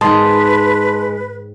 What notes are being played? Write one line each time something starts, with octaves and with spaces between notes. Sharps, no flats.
G#2 D#3 G#3 B4 D#5 A5 C6